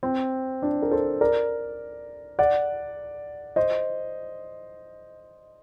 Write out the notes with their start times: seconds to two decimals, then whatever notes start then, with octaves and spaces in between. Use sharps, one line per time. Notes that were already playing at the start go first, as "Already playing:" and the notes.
0.03 C4
0.62 D4
0.82 A#4
0.91 A4 C5
1.21 A#4 D5
2.39 D5 F#5
3.56 C5 D#5